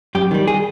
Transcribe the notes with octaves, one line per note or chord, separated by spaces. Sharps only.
F#2 G4
D#3 G3
G#4